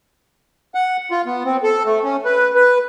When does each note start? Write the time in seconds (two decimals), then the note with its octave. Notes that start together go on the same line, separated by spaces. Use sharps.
0.75 F#5
1.11 F4
1.26 B3
1.45 C4
1.63 A4
1.86 A3
2.04 C#4
2.25 B4
2.55 B4